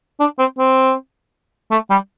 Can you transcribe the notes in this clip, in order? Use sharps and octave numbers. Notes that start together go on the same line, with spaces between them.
D4
C4
C4
A3
G3